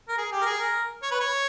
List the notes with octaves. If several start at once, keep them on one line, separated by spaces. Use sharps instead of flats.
A#4
G#4
G4
A#4
G#4
A#4
C#5
B4
C#5